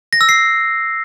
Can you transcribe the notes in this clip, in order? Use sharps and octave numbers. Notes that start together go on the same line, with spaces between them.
A#6
E6
C7